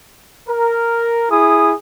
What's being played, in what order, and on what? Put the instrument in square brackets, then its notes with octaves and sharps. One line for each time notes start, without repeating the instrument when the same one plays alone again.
[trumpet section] A#4
[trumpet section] E4 D#6 [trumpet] G#4